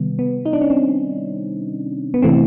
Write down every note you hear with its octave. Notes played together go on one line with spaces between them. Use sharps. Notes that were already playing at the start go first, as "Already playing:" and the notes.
Already playing: C3 D#3 G3 B3
B3
D#4
D4
C#4
C4
B3
C3 E3 A3 C4